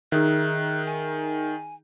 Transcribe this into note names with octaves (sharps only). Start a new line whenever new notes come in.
D#3 D#4 G#4 E5 F#6
G#5